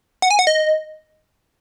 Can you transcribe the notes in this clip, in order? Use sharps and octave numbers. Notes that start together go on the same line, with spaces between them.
F#5
G#5
F#5
D#5